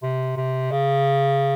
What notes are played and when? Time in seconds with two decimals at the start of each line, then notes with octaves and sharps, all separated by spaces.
0.03 C3
0.37 C3
0.71 C#3